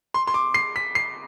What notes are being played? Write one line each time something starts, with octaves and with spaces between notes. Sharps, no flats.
C6
C6
D6
C7
B6
C7